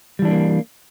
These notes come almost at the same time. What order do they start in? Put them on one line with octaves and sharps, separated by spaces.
G3 E3 D4 A3 A#3